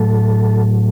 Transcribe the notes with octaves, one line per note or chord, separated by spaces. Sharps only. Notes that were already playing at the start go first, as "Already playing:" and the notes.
Already playing: A2 F#3 A3 A4